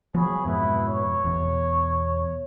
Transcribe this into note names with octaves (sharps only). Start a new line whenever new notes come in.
F3 F#3 B3 G#4 C#5 B5
F2 G#2 B2 E4 B4
C#5
E2 B2